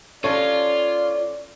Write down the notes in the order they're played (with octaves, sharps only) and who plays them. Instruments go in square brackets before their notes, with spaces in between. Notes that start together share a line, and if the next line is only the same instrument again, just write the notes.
[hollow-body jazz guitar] C#4 A4 [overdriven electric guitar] F4 [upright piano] C#5 [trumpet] D5